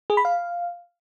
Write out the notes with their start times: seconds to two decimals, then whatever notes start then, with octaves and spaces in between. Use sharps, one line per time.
0.10 G#4
0.17 B5
0.25 F5